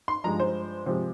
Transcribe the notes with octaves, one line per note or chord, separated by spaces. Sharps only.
C6
G2 F3 G#3 A#5
C5
C3 F3 G#3 C5